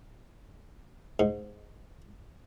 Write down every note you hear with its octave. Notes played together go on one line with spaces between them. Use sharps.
G#2